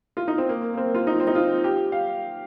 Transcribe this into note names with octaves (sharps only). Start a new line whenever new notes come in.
F4
D#4
C4
A#3
A#3
C4
F4
D#4
C4
D#4
F4
G4
F5